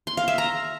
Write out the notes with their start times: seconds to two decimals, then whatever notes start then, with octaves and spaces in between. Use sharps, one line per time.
0.07 C6
0.17 F5
0.28 E5
0.38 A#5